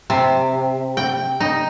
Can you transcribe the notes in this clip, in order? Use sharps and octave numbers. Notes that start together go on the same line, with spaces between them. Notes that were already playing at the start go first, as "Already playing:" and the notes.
C3
G5
D#4